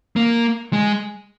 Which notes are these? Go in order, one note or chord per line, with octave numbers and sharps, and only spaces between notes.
A#3
G#3